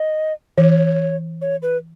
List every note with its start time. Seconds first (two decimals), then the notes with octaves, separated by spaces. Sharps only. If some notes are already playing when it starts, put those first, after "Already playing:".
Already playing: D#5
0.58 E3 C#5
1.42 C#5
1.62 B4